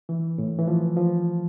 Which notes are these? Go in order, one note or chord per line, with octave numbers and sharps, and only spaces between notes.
E3
A2
E3
F3
F3